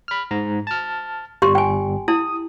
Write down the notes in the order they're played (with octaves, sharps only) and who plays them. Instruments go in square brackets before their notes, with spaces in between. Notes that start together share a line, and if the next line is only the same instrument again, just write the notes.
[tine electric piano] B5 F6
G#2 A#5
A5 F6
[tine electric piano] G1 G3 [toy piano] G4 C6
[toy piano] G5 G#5
[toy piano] E4 [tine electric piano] D#6